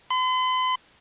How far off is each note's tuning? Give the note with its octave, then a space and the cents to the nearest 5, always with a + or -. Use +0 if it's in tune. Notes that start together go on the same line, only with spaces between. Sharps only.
C6 -45